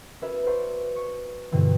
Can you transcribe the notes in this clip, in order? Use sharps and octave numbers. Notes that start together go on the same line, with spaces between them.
C#4 F#4 A#4 B4 E5
B4 C5 D5 F#5 A#5 C#6
C#6
G2 B2 D3 E3 C4